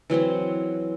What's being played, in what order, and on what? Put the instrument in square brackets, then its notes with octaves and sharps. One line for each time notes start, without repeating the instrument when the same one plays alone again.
[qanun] E3 F#3 C4 F#5